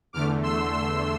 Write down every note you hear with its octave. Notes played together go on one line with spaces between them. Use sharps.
E2 D3 A3 D6 F6
C6 E6
C6 E6